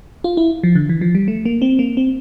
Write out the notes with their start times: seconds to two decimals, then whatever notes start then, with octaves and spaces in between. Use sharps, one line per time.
0.24 F4
0.37 E4
0.63 F3
0.75 D3
0.89 E3
1.01 F3
1.15 G3
1.28 A3
1.45 A#3
1.62 C4
1.79 A#3
1.97 C4